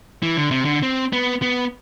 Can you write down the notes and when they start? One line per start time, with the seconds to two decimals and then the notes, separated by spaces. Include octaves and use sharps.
0.23 E3
0.37 D3
0.51 C3
0.65 D3
0.83 C4
1.13 B3
1.42 B3